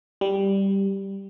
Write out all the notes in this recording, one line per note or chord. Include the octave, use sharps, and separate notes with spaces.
G3